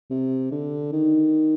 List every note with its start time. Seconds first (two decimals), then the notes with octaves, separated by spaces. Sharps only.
0.10 C3
0.51 D3
0.93 D#3